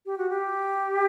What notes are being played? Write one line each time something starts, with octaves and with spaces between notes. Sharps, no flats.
G4
F#4
G4